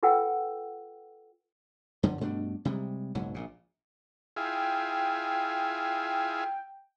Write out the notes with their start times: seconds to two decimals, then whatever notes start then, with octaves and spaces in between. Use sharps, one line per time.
0.03 F4 A4 B4 F#5 G5 E6
2.03 F#2 D3 F3
2.21 G2 B2 A3 D4
2.65 C3 G3 G#3
3.15 F#1 B1 G#2 F#3
3.34 A#1 A#2
4.37 E4 F4 G#4 G5